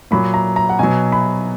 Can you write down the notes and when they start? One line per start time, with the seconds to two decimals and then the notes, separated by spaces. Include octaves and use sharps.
0.11 A#2 F#3 B5
0.34 A#5
0.56 A#5
0.69 F#5
0.79 B2 F#3 G#5
1.12 B5